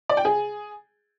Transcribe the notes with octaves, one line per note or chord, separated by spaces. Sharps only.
D5
G5
G#4